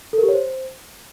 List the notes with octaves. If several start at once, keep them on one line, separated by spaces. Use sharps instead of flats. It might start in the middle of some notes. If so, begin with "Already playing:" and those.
A4
A#4
G4
C#5
C5